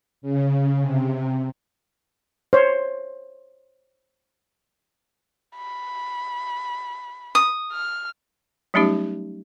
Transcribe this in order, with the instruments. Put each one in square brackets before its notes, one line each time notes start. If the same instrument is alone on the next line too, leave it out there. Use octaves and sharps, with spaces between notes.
[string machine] C#3
C3
[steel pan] C5 C#5
[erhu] B5
[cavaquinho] D#6
[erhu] F6
[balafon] F#3 G3 A3 C#4 D#4 G4